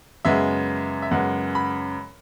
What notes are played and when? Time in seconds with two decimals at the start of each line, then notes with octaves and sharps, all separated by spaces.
0.25 F#2 C#3 G#3 B3 E5
1.02 E5
1.11 F#2 C#3 G#3 B3 F#5
1.55 B5